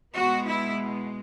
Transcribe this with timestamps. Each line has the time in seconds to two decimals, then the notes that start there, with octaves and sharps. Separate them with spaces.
0.15 B2 G#3 B3 F#4
0.44 E4